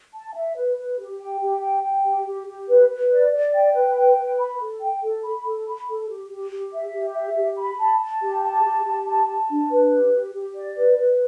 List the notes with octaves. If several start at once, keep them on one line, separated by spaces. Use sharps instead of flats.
A5
E5
B4
B4
G4
G5
G4
G5
G5
G4
G4
G4
B4
B4
D5
D5
G5
B4
G5
B4
B5
A4
G5
A4
B5
A4
B5
A4
G4
G4
G4
E5
G4
E5
G4
B5
A5
A5
G4
A5
G4
G4
A5
A5
D4
B4
G4
G4
G4
D5
B4
B4